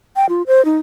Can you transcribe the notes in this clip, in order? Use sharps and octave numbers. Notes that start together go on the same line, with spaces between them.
G5
F4
C5
D#4